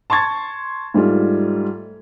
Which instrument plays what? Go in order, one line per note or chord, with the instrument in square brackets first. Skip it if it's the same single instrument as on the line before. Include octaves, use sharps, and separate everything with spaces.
[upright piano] A5 C6 C#6 G#6 A6
G#2 G3 A3 F4